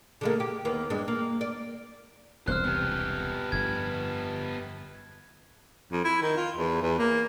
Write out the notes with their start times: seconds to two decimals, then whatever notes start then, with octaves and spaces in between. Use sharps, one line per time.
0.21 D3 G#3 A#3
0.40 G4
0.65 D#2 A#3 B3
0.90 G2 G#3 D4
1.08 A#3
1.41 D5
2.48 E1 C2 C4 C5 F6 F#6
2.64 B3 G4
3.52 G1 F2 G#6
5.92 F2
6.05 E4
6.22 D#3
6.37 F4
6.57 E2
6.82 E2
6.99 A#3